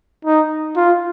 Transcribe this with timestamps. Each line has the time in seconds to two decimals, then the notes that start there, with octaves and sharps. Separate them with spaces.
0.25 D#4
0.76 F4